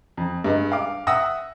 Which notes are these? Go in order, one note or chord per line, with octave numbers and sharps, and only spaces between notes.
F2
G2 G#3
F5 D6
E5 F#5 D#6 E6 A#6